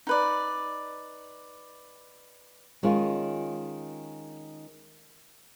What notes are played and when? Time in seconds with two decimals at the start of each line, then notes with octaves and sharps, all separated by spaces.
0.07 D#4 B4 D5
2.83 D#3 G#3 C#4 F4